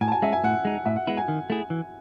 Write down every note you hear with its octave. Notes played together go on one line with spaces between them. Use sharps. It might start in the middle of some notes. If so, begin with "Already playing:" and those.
A2 G#5
A5
G#5
G#3 C#4 E5
G#5
A2 F#5
G#3 D#4
A2 E5
F#5
G#3 B3 E4 F#5
G#5
D#3
A3 E4 G#4
E3